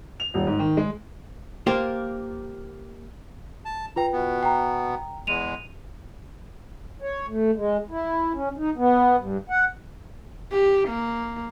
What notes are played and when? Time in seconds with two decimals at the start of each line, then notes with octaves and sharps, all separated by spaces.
0.20 F7
0.34 D#1
0.47 G#2
0.59 D#3
0.77 G#3
1.67 A#3 F4 G4 A#4 C5
3.65 A5
3.96 F4 B4 G5 A#5
4.13 B2 B3
4.43 G5 A#5
5.27 E2 G#3 D#7 F7
7.02 C#5
7.29 A3
7.56 G#3
7.90 E4
8.34 C#4
8.58 D#4
8.77 B3
9.18 G2
9.50 F#5
10.51 G4
10.89 A#3